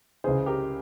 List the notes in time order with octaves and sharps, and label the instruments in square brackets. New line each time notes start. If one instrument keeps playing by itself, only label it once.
[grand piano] C#2 C#3 E3 G#4 C5
G4 A#4